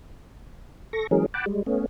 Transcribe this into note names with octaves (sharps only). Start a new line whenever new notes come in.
A4 C#6 A#6
E3 F#3 G#3 C#4 G#4 A#4
F#5 G5 A5 B5 D6
G3 G#3
A3 B3 C#4